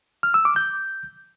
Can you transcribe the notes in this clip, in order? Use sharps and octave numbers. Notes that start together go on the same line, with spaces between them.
F6
E6
D6
G6